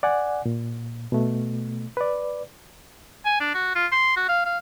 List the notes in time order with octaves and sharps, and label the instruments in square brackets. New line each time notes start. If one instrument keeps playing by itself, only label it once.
[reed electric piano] D5 F#5 G#5
A#2
B2 A3
B4 D5
[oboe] G#5
D4
F#4
F4
C6
F#4
F5
F5